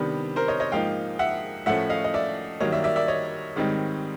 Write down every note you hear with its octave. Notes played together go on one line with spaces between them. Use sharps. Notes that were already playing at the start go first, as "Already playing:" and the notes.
Already playing: C3 D#3 G3 B3 D4
A#4 C5
C#5 D#5
C#5 D#5
G#2 F3 A#3 D#4 F5 G5
E5 F#5
A2 F3 A3 C#4 E5 F#5
D#5 F5
D#5
D5 E5
G2 D#3 F#3 A#3 C#5 D#5
D5 E5
D5 E5
D5 E5
C#5 D#5
G#2 D#3 G3 C4 D#4